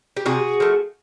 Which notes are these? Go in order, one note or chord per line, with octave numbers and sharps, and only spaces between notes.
G4
C3 F#4 G#4
F3 A3